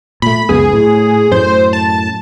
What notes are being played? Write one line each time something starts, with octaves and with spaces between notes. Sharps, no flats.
A#2 A3 B5
C#2 F#2 B3 G#4
A2
F#2 A2 C5
A5